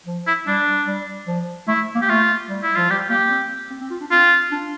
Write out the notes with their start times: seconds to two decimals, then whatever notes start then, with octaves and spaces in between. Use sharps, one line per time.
0.06 F3
0.27 E4
0.47 G3 D4
0.87 G3
1.27 F3
1.68 A3 E4
1.95 A#3
2.02 G4
2.09 A3 F4
2.49 G3
2.63 E4
2.76 F3 F4
2.90 G3 G4
3.10 A#3 G4
3.30 C4
3.71 C4
3.81 C4
3.91 F4
4.01 D4
4.11 C4 F4
4.52 D4